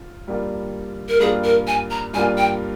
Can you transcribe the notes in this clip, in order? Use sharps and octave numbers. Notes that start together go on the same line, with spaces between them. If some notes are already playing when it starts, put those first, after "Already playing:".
Already playing: F4
G2 G3 A#3 F4
A#4
G2 G3 A#3 F4 G#4
A#4
G#5
A#5
G2 G3 A#3 F4 G#5
G5